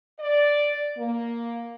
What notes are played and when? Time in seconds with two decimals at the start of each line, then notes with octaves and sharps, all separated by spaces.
0.19 D5
0.98 A#3